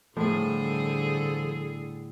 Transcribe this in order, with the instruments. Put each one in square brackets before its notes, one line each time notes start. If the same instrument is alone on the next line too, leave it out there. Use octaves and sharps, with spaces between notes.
[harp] A2 [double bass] D3 [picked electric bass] F3 [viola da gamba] G3 G#4 A4